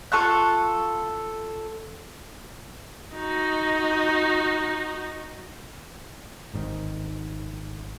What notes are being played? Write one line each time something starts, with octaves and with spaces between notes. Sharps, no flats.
F4 A4 C#6 F#6
D#4 F#4
G#1 G#2 D3 D#3